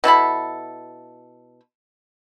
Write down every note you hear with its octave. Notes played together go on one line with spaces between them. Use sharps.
B2 E4 A4 B5